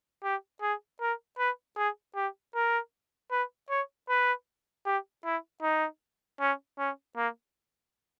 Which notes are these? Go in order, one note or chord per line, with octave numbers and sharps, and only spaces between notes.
G4
G#4
A#4
B4
G#4
G4
A#4
B4
C#5
B4
G4
E4
D#4
C#4
C#4
A#3